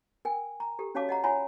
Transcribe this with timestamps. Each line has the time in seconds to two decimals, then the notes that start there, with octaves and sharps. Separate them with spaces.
0.25 A#4 G5 G#5
0.60 A#5
0.79 G4 A4
0.95 C#4 F#4 C#5 F5 A5 D6
1.09 D#5 F#5 A#5
1.24 F4 C#5 F#5 G#5 A#5 B5